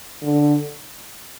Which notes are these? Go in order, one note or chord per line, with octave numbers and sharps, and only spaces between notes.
D3